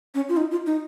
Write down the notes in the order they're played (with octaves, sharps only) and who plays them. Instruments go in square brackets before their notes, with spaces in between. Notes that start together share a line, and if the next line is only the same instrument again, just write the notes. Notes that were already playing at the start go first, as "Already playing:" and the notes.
[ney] C#4
F4
D#4
F4
D#4